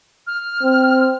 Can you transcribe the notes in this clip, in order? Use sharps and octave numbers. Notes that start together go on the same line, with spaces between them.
F6
C4